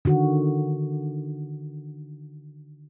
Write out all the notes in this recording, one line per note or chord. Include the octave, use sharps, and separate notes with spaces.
D3 D#3 F#4